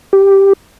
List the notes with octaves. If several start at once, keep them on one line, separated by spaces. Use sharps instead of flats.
G4